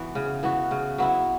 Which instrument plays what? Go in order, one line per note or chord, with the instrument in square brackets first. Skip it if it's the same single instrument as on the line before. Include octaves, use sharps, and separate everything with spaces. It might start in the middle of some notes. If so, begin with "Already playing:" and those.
Already playing: [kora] E3 B3 F#4
C#3
E3 B3 F#4
C#3
F#3 B3 E4